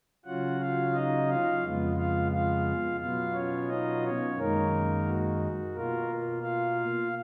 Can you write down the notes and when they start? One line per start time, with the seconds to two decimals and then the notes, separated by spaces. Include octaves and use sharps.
0.25 C#3 F#3 C#4 F4 F#4 F#5
0.60 F4 F5
0.94 D#4 D#5
1.28 F4 F5
1.63 F2 C#3 G#3 B3 F4
1.97 F4 F5
2.31 F4 F5
3.00 B2 F#3 B3 F4 F5
3.34 C#4 C#5
3.68 D#4 D#5
4.03 C#4 C#5
4.37 F#2 D#3 G#3 A#3 D#4 A#4
5.05 F#4
5.74 B2 A#3 F4 A#4
6.42 F4 F5